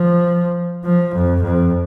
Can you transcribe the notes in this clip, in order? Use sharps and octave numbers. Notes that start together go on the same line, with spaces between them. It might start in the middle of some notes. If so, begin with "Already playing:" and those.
Already playing: F3
F3
F2
F2